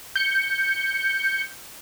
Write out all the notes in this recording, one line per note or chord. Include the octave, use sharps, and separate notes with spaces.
G6 C#7